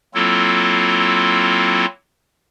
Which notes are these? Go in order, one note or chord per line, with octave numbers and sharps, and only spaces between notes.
F#3 A#3 C4 E4 F4 A4